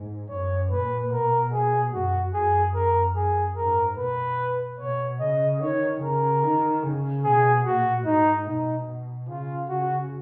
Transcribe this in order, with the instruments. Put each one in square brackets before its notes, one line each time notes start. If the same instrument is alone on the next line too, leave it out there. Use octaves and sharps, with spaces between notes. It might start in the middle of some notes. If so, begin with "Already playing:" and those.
Already playing: [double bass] G#2
[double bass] F#2 [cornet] C#5
[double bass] A#2 [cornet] B4
[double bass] B2 [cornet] A#4
[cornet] G#4
[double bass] F#2 [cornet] F#4
[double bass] F#2 [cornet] G#4
[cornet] A#4
G#4
[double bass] G#2 [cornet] A#4
[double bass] B2 [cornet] B4
[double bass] B2 [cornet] C#5
[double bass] C#3 [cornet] D#5
[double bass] D#3 [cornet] C#5
[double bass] C#3 [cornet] A#4
[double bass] D#3
C#3
[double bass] B2 [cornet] G#4
[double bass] A#2 [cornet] F#4
[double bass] G#2 [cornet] D#4
[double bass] B2 [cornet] D#4
[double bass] B2
[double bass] C#3 [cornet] F4
[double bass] C#3 [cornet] F#4